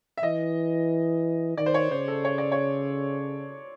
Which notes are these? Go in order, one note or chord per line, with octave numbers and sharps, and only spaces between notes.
E5
E3 D#5
D#3 D5
C5
C#5
C#3 C5
A4
C#5
D5
C#5